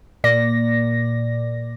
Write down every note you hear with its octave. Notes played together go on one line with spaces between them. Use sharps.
A#2 A#3 D5 A#6